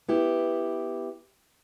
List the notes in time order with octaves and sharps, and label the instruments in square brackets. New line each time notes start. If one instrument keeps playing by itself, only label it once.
[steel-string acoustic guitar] B3 E4 G4